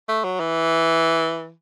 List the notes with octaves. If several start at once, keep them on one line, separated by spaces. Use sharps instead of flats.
A3
F#3
E3